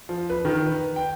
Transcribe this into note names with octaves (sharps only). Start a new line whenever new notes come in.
F3
B4
D#3
B4
G5